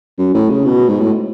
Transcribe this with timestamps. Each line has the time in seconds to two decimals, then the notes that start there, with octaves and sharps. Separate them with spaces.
0.18 F#2
0.34 A2
0.50 C#3
0.65 B2
0.89 G#2
1.01 A2